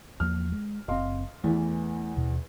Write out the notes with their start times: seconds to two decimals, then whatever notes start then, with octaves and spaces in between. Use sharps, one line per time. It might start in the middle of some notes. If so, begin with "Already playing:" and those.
0.20 E2 F3 A#3 F6
0.52 G#3
0.88 F#1 A2 C4 D#5 F5 C6
1.44 E2 E3 A3
2.17 D#2 B2